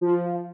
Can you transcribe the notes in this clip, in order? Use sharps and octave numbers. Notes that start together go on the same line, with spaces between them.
F3